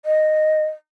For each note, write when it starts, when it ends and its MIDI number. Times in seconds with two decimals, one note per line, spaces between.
0.05 0.64 75